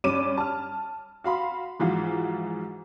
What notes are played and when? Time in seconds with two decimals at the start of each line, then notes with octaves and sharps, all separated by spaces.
0.04 G2 C#4 D6 D#7 E7
0.37 A5 F6
1.24 F#4 F5 B5 C6
1.80 G#2 E3 F3 F4 F#4